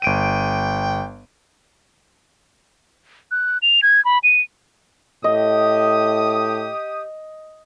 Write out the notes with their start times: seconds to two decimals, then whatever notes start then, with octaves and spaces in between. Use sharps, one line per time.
0.02 G1 G5 D7 D#7
3.31 F#6
3.62 F7
3.83 G#6
4.05 B5
4.23 D#7
5.24 A2 G4 D#5 D#6